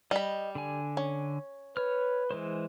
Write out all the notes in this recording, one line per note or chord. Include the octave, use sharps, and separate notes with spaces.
G3 D#5 B5
D3 G#5
C#4
B4 C#5 F6
E3 G#3 C5